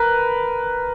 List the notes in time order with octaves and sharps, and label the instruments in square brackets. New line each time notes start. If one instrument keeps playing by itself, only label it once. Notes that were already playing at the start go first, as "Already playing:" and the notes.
Already playing: [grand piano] A#4 B4